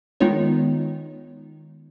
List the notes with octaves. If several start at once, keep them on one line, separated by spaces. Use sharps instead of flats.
D#3 G#3 B3 D#4 F4 C#5